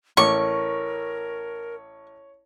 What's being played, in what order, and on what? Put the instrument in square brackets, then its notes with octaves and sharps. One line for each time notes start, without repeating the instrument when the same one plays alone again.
[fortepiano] A1 D6 [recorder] A#4 [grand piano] C#5 [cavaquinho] C#6